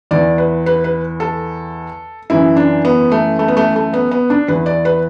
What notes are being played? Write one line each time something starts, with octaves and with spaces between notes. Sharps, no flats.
E2 E3 D5
B4
B4
B4
A4
F#2 E3 E4
D4
B3
A3
A3
B3
A3
A3
B3
B3
D4
E2 E3 B4
D5
B4